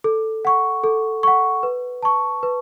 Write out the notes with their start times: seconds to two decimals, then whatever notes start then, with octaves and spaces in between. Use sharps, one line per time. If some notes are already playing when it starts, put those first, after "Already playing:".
0.04 A4
0.45 F#5 C#6
0.84 A4
1.23 F#5 C#6
1.63 B4
2.03 A5 C#6
2.43 B4